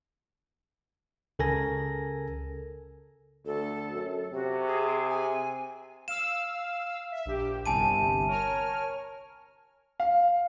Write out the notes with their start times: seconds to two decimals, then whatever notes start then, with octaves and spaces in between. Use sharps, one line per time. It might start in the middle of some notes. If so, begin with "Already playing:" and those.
1.39 C#2 C#3 A4 A#4 G#5 A#6
3.46 D2 A4
3.93 F#2
4.33 C3 F#4
4.66 G#4
5.09 G#5
6.08 F5 E6 E7
7.12 E5
7.25 A#1 G4
7.66 G1 C2 C3 G#5 A5 D#7
8.27 A#4 C#5 F6
10.00 F5